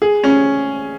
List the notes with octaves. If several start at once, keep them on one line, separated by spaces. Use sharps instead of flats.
G#4
C#4